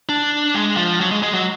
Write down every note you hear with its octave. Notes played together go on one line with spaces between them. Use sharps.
D4
G#3
F3
F#3
G#3
G#3
F#3